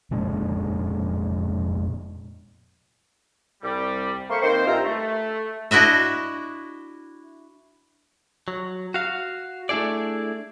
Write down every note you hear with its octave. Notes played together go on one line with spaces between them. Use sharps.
F1 A#2 G#3 C#4
C2 G3
A3 A#3 A#4 C5 B5 C#6
D#3 A#3 C4 C5
G2 F4 E5 G5 A#5
A3
D4 E4 F#4 D#5 E5
F#3
F#4 F5
A3 D4 E4 G#4 D5